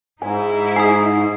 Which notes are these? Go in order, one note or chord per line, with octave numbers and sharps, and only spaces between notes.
G#2 D#4 E4 G#5
G#4 D#6 C7